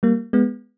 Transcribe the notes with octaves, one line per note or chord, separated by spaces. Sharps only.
G3 A#3
G#3 B3